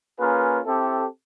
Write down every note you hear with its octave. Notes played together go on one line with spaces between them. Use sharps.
A#3 C#4 F4 G#4 A#4 B4
C4 E4 G4 A4